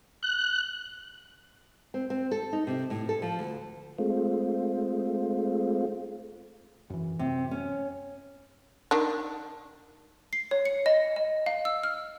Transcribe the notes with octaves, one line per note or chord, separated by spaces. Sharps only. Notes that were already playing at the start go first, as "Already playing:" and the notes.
F#6
C4
C4
A4
D#4
C3
A2
A4
F3
D2
G#3 A3 C4 F4
F#2 E3
F#2 C3
C#4
D#3 D4
C7
C#5
C#7
D#5
D#5
F5
E6
F6